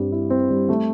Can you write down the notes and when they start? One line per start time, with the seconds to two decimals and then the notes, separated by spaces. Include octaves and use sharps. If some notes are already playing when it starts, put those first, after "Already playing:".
Already playing: G2 G3 C4
0.12 E4
0.30 C4
0.50 G3
0.69 A3